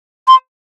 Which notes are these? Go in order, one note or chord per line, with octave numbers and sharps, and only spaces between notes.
C6